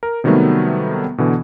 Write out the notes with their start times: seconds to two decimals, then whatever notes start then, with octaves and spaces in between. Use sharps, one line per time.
0.03 A#4
0.24 C3 D#3 F#3 G3 A3 B3
1.18 B2 D3 E3